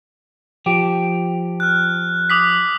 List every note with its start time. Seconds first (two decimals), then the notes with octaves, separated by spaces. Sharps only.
0.66 F3 G4
1.60 F6 F#6
2.30 D6 D#6 B6